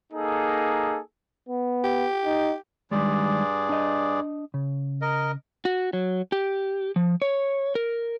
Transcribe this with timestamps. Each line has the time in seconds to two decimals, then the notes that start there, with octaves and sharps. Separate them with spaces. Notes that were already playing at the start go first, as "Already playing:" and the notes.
0.13 A#3 D#4 G#4 A4
1.49 B3
1.84 G4
2.26 D#4
2.91 G2 D#3 G3 G#3 G#4 D5
3.69 D4 D#5
4.54 C#3
5.02 A#4 D#5
5.65 F#4
5.93 F#3
6.32 G4
6.96 F3
7.22 C#5
7.75 A#4